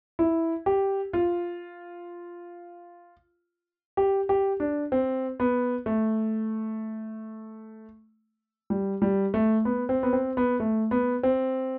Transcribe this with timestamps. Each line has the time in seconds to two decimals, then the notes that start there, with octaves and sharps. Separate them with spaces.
0.19 E4
0.66 G4
1.13 F4
3.97 G4
4.29 G4
4.60 D4
4.92 C4
5.40 B3
5.86 A3
8.70 G3
9.02 G3
9.34 A3
9.65 B3
9.89 C4
10.03 B3
10.13 C4
10.37 B3
10.60 A3
10.91 B3
11.23 C4